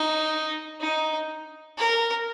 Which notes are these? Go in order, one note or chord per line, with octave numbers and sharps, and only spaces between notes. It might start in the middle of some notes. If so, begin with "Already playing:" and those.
Already playing: D#4
D#4
A#4